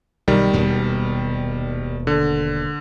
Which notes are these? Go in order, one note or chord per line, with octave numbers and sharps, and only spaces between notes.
B1 D#3 G3
D#1 B2 G#3
D3